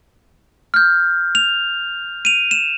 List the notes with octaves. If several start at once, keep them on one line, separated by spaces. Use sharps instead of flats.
F6 G6
F7
D#7 F7
E7